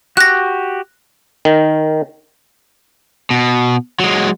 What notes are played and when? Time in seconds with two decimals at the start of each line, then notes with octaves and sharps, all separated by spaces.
0.17 F#4 G4 F#6 A#6
1.45 D#3
3.30 B2
4.00 F#3 G#3